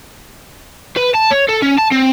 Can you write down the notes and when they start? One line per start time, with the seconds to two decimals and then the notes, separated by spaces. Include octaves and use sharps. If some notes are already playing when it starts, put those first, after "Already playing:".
0.96 B4
1.14 A5
1.31 C#5
1.48 A4
1.62 C#4
1.78 A5
1.91 C4